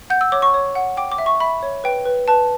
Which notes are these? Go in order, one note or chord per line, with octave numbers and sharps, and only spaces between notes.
F#5 G6
E6
C#5 D6
C#6
C#5
F#5
G5 D6
D6
E5
C#6
E5 B5
C#5
B4 G5
B4
B4 A5